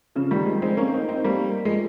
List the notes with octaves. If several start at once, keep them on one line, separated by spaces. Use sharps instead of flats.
C#3 F3
D#3 G3
F3 G#3
G#3 C4
A#3 C#4
C4 D#4
C4 D#4
G3 A#3
F3 G#3